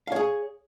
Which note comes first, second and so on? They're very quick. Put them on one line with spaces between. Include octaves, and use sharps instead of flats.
F5 C#5 G#4